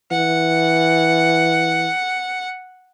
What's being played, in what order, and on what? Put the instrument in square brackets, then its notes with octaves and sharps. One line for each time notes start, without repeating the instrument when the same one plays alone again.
[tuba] E3 [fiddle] F#5